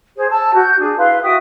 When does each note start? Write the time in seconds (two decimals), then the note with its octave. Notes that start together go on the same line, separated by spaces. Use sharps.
0.15 G#4 C5
0.30 A5 E6
0.54 F#4 G6
0.79 D4 G#4
0.98 E4 B4 F5 C6
1.22 F#4 E5 G5 D#6